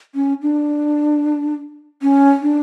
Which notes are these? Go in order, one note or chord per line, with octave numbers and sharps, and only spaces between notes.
C#4
D4
C#4
D4